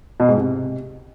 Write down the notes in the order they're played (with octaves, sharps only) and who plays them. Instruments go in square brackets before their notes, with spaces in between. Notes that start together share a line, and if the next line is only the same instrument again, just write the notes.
[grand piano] B2
G#2
C3